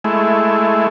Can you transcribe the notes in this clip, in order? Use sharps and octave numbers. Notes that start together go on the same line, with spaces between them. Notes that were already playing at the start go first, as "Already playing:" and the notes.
G#3 A3 E4